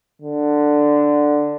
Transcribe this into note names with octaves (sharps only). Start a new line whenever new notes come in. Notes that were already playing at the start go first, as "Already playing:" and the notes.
D3